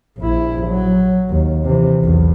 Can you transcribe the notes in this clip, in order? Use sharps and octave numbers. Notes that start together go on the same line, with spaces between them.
A#1 E4
F#3
D#2
C3 E3
B1 E2